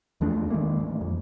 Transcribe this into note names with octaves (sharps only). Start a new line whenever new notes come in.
E2 F3 A3 D4
D#3 G#3 A#3
A1
F2